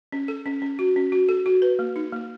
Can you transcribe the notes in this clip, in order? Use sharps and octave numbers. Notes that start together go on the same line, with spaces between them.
C#4
A4
C#4
C#4
F#4
C#4
F#4
A4
F#4
B4
A#3
D#4
A#3